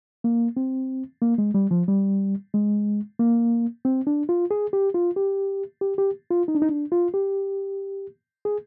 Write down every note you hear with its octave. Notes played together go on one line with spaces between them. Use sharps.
A#3
C4
A#3
G#3
G3
F3
G3
G#3
A#3
C4
D4
F4
G#4
G4
F4
G4
G4
G4
F4
D#4
D4
D#4
D4
F4
G4
G#4